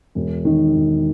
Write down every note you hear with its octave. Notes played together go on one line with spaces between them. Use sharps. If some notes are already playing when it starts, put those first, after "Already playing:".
E1
D#3
E1